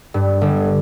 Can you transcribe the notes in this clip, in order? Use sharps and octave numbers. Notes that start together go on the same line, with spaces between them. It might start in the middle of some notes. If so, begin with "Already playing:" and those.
G2
G1